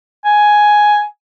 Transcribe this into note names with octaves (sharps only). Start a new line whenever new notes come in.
G#5